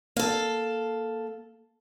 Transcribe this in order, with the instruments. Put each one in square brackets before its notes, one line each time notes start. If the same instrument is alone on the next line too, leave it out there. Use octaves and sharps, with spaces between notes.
[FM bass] A#3 [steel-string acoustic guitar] A4 F5